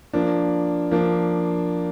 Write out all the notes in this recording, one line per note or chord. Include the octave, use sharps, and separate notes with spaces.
F3 A#3 D4
F3 A#3 D4